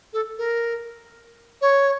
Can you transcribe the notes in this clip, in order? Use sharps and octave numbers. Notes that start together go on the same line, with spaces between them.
A4
A#4
C#5